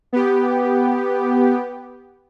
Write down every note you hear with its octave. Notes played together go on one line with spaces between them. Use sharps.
B3 G4